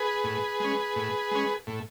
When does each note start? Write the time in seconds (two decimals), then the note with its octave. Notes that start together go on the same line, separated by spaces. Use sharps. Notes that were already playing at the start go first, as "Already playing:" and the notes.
Already playing: G#4 B4
0.24 A2
0.60 G#3 C#4
0.96 A2
1.31 G#3 C#4
1.67 A2